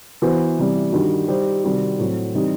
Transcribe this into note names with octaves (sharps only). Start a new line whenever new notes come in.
E3 B3 F#4 C5
C3 E3 G3
G2 D#3 G3 D#4 F#4
G3 D#4 G4 C5
C3 D#3 G3 C4 F#4
A2 F#3 C4 F#4
E3 G3 C4 D#4 G4